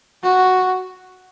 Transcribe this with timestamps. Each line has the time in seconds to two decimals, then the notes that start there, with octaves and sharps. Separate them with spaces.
0.23 F#4